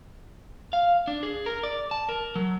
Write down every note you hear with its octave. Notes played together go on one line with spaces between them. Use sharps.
F5
D4
G#4
A#4
D5
A5
A#4
F#3